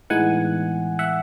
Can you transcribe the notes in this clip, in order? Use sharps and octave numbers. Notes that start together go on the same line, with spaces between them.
A2 E3 G#3 B3 D#4 F#5 G#5
E5 F#5